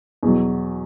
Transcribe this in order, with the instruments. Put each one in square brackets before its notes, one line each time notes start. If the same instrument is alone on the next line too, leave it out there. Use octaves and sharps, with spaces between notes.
[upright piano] E2 B2 F#3